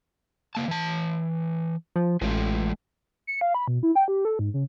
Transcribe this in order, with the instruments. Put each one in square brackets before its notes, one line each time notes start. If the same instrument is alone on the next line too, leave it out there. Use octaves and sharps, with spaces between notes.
[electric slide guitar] C#3 A#3 A5
E3 A5
[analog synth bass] F3
[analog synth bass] A1 [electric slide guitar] G#3 A3 F4
[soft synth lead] C#7
F5
B5
B2
E4
G5
G4
A4
G#2
C#3